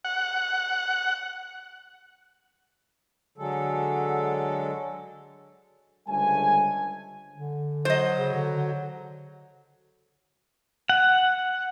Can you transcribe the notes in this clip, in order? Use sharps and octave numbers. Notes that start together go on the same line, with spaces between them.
F#5
D3 F#3 G#3 A4
C#2 D3 G3 A3 C5 G#5
D3
F#3 C5 D#5
C#3
D3
F#5